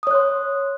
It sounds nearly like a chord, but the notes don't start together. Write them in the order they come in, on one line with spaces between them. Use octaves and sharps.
D#6 C#5 F#6 C6